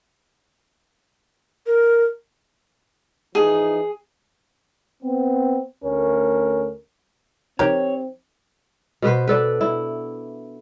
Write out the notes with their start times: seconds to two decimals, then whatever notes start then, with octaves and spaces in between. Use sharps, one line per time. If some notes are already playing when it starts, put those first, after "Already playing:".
1.67 A#4
3.35 E3 F3 D#4 G#4
5.03 B3 C4
5.83 D2 A3 C#4 A#4
7.59 C#2 F3 C4 D#4 G4 A#4 C#5
9.02 B2 B3 B4 C5
9.28 D4 A4 B4
9.61 E4